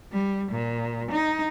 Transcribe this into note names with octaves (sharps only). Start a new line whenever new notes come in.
G3
A#2
D#4